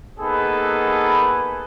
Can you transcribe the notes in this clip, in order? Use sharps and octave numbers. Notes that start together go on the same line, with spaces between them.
A#3 B3 D#4 G#4 A4 B4